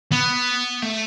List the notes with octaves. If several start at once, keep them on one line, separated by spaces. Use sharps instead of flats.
B3
A3